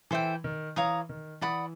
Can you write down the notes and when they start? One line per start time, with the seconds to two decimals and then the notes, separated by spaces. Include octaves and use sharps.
0.11 E3 A4 C5 E5 G5
0.44 D#3
0.76 E3 C#5 F5 A#5 D#6
1.09 D#3
1.41 E3 D5 F#5 B5 D#6